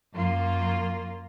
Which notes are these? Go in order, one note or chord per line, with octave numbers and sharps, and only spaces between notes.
F#2 A#3 F4